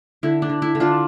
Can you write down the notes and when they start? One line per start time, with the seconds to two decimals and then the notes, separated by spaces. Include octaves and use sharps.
0.23 D3 E4
0.42 D4
0.50 D3
0.62 E4
0.75 D3
0.80 D4 F4